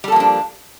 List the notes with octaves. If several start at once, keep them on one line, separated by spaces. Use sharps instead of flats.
F3 G3 A#3 D4 A4